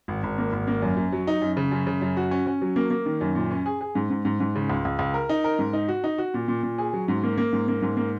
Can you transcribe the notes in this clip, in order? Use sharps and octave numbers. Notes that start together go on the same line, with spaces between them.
G#1
G#1
A#3
G#1
A#3
F#2
F#2
F#3
D#4
F#2
C#3
F#2
C#3
F#2
F#4
C#4
C#4
F#3
A#3
A#3
D#3
F#2
A#2
C#4
G#4
G#4
G#2
G#2
G#2
G#2
C#3
C#2
C#2
C#2
A#4
D#4
A#4
G#2
D#4
F#4
D#4
F#4
A#2
A#2
A#2
G#4
F#3
G#2
A#3
A#3
G#2
A#3
G#2
A#3